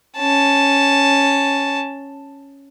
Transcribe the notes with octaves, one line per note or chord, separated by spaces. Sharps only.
C#4 A5